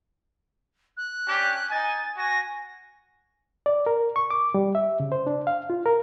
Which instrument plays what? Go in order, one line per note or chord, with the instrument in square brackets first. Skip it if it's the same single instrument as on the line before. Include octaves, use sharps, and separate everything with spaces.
[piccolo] F#6
[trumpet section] C#4 D4 G4
[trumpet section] D#4 D#5 G#5 [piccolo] A6
[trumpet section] F#4 G#5 [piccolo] A#6
[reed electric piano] D5
A#4
C#6
D6
G3
E5
C#3
C5
D4
F5
F4
A#4